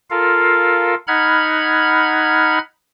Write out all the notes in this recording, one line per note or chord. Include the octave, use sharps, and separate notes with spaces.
F4 A4 A#4 F5
D#4 F#5 B5 F6 G#6